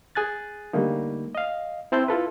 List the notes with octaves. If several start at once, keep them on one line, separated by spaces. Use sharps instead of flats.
G#4 G#5 F#6 A6
D3 G3 A3 A#3 D#4
D#5 F5
C4 E4 C5 A5 E6 G6
E4 F4 A4 B4